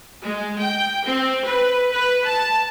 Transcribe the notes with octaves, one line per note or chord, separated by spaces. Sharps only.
G#3
G5
C4
B4
B4
A5